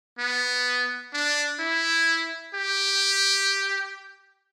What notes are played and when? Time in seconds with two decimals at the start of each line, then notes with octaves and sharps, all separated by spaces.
0.19 B3
1.13 D4
1.60 E4
2.54 G4